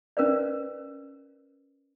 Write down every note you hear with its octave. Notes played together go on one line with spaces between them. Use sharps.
C#4 A#4 B4 D5